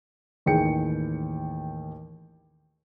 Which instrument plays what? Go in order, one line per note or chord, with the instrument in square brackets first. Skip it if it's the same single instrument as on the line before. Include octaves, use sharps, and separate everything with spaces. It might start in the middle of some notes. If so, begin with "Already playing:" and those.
[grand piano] A1 D#2 G#4 G5 C#7